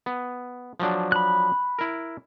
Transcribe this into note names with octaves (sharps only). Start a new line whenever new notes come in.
B3
F3 F#3 D4
B5 F#6
E4 A#4